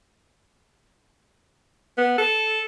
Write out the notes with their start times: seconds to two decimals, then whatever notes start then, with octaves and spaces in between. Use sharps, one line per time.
1.98 B3
2.18 A4